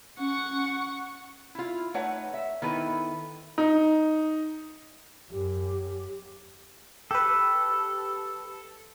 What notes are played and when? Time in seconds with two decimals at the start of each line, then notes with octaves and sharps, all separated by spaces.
0.19 C#4 F#5 C#6
1.55 E4 F4
1.94 A3 D#4 B4 C#5 F#5
2.34 E5
2.62 D#3 B3 E4 A4 B4
3.58 D#4
5.31 F#2 G4
7.11 G4 A4 B4